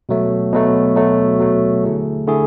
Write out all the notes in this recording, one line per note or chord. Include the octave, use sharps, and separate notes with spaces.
B2 F#3 A3
B2 F#3 A3
B2 F#3 A3
B2 F#3 A3
D3 A3 E4 G#4
D3 A3 E4 G#4